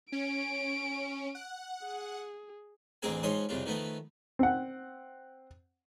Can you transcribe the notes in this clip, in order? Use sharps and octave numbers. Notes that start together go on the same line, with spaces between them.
C#4 D7
F#5
G#4
A1 D2 C4 G#4 A#4 G#5
G#2 F3 C#4 C#5 C6 D#6
C2 F2 C#3 F4
D#3 F3 A3 B3
C4 F#5